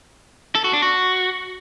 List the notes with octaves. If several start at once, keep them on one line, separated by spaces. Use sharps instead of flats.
A4
F#4
D4
F#4